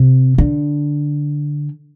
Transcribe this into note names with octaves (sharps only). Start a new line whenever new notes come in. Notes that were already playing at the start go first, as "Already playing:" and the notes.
Already playing: C3
D3